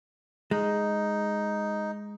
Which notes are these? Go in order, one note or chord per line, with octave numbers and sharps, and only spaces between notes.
G#3 D#4